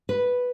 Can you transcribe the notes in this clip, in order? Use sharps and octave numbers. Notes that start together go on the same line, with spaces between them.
B4